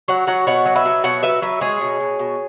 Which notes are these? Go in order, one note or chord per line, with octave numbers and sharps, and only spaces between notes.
F#3 C#5 F#5
F#3 C#5 F#5
B2 C#5 F#5
F#3
B4 E5
F#3
B2 C#5 F#5
F#3 B4 E5
F#3 B4 E5
G#3 G#4 C#5
B2
B2
B2